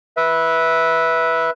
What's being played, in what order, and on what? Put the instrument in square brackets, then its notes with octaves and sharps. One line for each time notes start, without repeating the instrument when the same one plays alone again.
[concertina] B4 E5